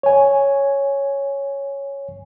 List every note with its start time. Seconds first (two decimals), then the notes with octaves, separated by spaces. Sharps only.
0.03 C#5 G#5